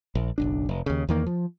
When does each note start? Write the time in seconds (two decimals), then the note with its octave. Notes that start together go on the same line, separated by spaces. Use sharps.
0.15 A#1
0.38 F#1 B1 D4
0.69 F1
0.86 D#2 C#3
1.09 E2 D#3 A#3
1.27 F3